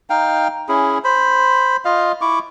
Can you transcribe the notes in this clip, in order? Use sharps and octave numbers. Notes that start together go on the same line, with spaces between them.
D#4 F5 G5
C#4 E4 G#4
C5 B5
F4 D#5 F5
E4 C#6 D6